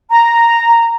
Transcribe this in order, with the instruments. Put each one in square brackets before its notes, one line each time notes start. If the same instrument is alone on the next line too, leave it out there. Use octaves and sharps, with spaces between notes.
[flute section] A#5